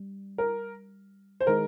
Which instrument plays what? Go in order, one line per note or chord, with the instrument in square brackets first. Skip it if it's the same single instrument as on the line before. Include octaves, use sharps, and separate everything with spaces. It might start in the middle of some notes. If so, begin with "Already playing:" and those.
Already playing: [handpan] G3
[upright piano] A#4
C5
[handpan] D#3 G#3 D#4 G#4 [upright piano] A#4